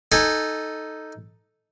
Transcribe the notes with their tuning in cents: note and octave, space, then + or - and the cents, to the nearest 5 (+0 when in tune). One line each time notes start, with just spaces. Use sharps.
D#4 +0 A4 +0 G#5 -25